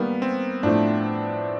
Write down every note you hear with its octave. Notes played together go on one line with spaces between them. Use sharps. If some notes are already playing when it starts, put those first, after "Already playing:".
Already playing: D#3 G3 A#3 B3
C4
A2 F3 A3 D4